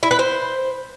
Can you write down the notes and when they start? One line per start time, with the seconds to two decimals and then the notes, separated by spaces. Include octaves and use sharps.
0.03 E4
0.11 B4
0.19 C5